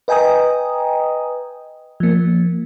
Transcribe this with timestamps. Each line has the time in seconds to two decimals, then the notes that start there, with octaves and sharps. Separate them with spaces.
0.08 B4 D#5 G5 G#5 A#5 D#6
2.00 F3 A#3